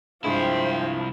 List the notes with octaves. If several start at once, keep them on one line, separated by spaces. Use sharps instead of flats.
C2 G2 F3 G#3 E4 C5 G5